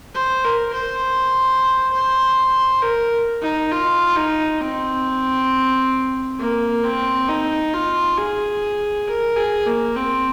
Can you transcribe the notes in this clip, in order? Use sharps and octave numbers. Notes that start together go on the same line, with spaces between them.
C5
A#4
C5
C5
A#4
D#4
F4
D#4
C4
A#3
C4
D#4
F4
G#4
A#4
G#4
A#3
C4